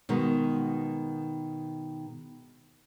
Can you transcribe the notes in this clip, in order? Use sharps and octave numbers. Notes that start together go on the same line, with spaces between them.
B2 D#3 G#3